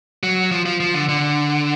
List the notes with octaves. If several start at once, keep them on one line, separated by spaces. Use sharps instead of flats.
F#3
F3
F3
F3
D3
D3